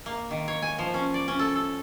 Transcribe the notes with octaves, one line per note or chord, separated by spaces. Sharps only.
A#3
D#3
C#5
G#5
F3
C#4
D5
C#4
A4
A4